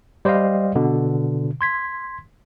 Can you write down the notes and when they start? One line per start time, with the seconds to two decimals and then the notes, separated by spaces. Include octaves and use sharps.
0.25 G3 C5 D5 D#5 F5
0.75 B2 D3
1.61 C6 G#6 B6